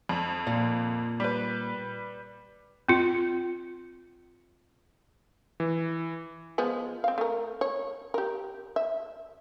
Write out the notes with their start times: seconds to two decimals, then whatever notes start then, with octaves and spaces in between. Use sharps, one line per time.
0.09 F2
0.47 A#2
1.20 G3 B4
2.89 C4 F4
5.60 E3
6.58 F3 G#3 B3
7.04 C4 F5
7.18 A3 A#4
7.61 C#5
8.14 G4 A#4
8.76 E5